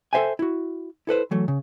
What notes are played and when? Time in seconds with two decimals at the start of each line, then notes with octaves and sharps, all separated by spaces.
0.13 A4 B4 C5 E5 G5 G#5
0.39 E4 F#4
1.07 E4 A4 B4 C5
1.31 E3 F#3 A3
1.48 C#3